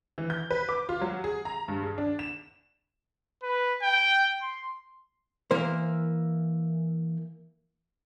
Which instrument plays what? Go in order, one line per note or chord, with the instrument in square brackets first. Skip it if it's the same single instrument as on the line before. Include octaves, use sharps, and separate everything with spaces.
[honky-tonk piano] E3
G6
B4
D6
F4
F#3
G#4
A#5
G2
G#4
D4
E7
[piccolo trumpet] B4
G5
C6
[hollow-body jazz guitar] E3 A#3 A#4 C5